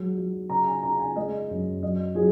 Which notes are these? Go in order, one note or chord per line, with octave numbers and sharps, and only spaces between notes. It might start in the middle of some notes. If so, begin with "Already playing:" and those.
Already playing: F#3 G#3
F#3
C#3 A#5
G#5
C#3 A#5
G#5
G#3 D#5
F#2
F#3 D#5
F#3 G#4